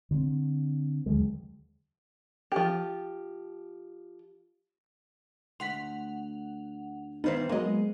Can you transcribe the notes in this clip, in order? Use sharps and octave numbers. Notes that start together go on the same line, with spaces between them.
D3 C4
D#2 D3 F#3 G#3
F3 G4
D2 F#5 C6 B6 F7
G2 D#3 E3 B3 D#4 C5
F#3 G#3 A#3 D#5